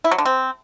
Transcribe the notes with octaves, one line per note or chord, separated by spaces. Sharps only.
E4
F#3
D3
C4